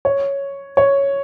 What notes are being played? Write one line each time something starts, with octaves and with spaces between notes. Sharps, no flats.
C#5
C#5